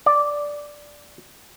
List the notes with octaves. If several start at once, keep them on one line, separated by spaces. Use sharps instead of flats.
D5